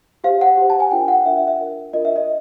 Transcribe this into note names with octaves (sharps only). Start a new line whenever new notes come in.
G4 C5 F5
F#5
G4 C5
A5
G#5
D4 F4 A#4 D5 G5
F#5
D4 F4 A#4 D5 E5
E5
E5
D4 F4 A#4
D4 F4 A#4 D#5
E5
D#5